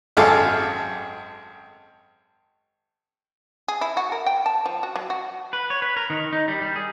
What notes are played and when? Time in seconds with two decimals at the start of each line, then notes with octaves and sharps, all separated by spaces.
0.17 G#1 F#2 G#4 A4 F5 D6
3.68 G#4
3.81 E4
3.97 F#4
4.12 A#4
4.26 G5
4.46 A5
4.66 F3
4.83 F#4
4.96 F#3
5.10 F#4
5.53 B4
5.70 C#5
5.82 B4
5.97 A#4
6.10 D#3
6.33 D#4
6.48 G3
6.62 G3
6.76 G#4